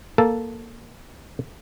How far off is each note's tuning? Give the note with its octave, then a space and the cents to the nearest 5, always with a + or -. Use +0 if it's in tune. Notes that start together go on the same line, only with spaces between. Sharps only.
A#3 +0 A4 +0